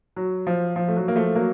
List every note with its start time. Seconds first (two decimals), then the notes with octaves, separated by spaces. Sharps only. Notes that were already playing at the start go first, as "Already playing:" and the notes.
0.16 F#3
0.47 F3
0.76 F3
0.88 A3
0.97 F#3
1.08 A#3
1.16 F3 A3
1.35 F#3 A#3